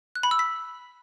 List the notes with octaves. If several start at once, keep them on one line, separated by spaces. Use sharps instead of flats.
F#6
B5
E6
B6